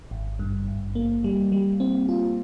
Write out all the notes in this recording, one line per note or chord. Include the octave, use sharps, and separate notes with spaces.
G#1
G2
G#1
A#3
G3
G3
C4
F4